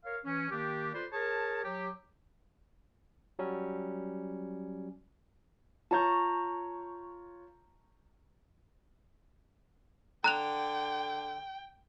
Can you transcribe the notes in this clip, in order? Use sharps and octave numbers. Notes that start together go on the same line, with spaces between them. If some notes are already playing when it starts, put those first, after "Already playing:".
A#4 C#5 F5
E3 C#4
D#3 A#3 D4 G4
F4 A4 B4 C5 D5
G#4 A#4 C#5 A5
F#3 G4
F#3 G3 C#4
F4 C#5 A5 A#5 C#6 G6
D3 G5 A#5 F#6 F7